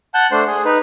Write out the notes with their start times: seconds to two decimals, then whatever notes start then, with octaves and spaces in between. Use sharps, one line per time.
0.14 F#5 A5 F#6 G6
0.32 A3 D4 C5 C6
0.47 G#4
0.65 D#4 B4